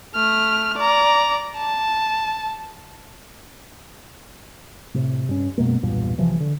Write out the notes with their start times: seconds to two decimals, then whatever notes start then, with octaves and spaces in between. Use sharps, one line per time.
0.14 A3 F6
0.78 D5 A#5
1.58 A5
4.94 A2 C3
5.29 G2 C#4
5.58 F#2 B2 G#3 A#3
5.82 B1 E2 G2 A#2
6.18 B1 C3 E3 F3
6.40 D3